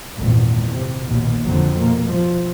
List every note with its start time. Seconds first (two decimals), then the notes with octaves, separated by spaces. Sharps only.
0.16 G#1 E2 A#2
0.70 C3
1.06 A#1 D#2 B2
1.46 F2 D3 F#3
1.78 B2 A#3
2.10 F3